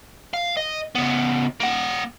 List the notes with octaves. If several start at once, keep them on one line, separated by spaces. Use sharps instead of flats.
F5
D#5
C#3 B3
A#3 F#5